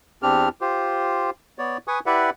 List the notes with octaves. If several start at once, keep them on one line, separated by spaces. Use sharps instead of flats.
E2 C4 D4 G4 F6
F4 G4 C5
B3 C#5 D5
B4 G#5 C#6 D#6
E4 G4 B4 D5 E5 F#5